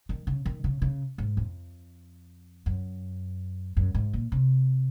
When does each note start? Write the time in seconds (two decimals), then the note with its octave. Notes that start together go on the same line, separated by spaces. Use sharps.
0.09 D#3
0.27 C#3
0.46 D#3
0.64 C#3
0.82 C#3
1.18 G#2
1.37 F2
2.66 F#2
3.77 F#2
3.95 G#2
4.13 A#2
4.32 C3